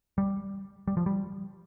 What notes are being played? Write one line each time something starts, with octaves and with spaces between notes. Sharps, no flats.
G3
G3
F3
G3